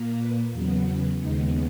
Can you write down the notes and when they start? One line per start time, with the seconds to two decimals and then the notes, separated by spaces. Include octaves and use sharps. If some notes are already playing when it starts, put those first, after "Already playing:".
Already playing: A#2 A#3
0.19 B4
0.52 E2 C#3 F#3 B3
0.85 C#4
1.19 D#2 C#3 G#3 B3 D#4